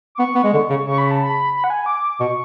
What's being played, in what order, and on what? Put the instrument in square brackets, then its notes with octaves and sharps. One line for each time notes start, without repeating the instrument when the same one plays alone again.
[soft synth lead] D6
[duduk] B3 [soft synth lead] C#6
[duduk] B3
G#3
D3
C#3
[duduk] C#3 [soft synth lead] C#6
[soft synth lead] B5
A5
B5
B5
F#5
G#5
D6
[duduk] B2 [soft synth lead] C#6